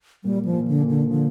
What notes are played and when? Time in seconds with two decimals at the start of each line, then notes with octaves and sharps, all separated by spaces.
0.24 A#2 G3
0.45 F3
0.52 A#2
0.68 D3
0.82 A#2
0.89 D3
1.10 D3 F3